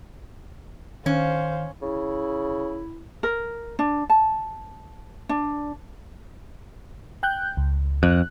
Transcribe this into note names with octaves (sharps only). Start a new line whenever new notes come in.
D#3 C#4 C5 F5
C#3 E4
A#4
D4
A5
D4
G5 F#6 G6
C#2
F2 F#6